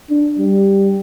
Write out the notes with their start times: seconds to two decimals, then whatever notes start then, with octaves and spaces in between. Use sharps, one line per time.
0.10 D4
0.39 G3